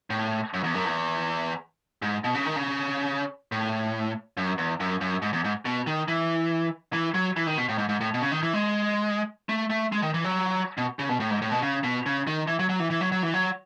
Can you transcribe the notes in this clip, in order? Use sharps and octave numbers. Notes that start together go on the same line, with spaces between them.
A2
F#2
E2
F#2
E2
G#2
B2
C#3
D#3
C#3
A2
F#2
E2
F#2
F#2
G#2
E2
G#2
B2
D#3
E3
E3
F#3
E3
D#3
B2
A2
G#2
G#2
A2
B2
C#3
D#3
E3
G#3
A3
A3
G#3
D#3
E3
F#3
B2
C#3
B2
A2
G#2
A2
B2
C#3
B2
C#3
D#3
E3
F#3
F#3
E3
E3
F#3
F#3
E3
F#3